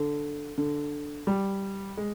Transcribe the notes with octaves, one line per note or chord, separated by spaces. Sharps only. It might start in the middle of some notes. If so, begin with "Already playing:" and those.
Already playing: D3
D3
G3
G#3